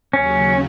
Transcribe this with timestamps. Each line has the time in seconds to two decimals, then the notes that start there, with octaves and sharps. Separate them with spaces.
0.13 D#2 C#3 F#3 C#4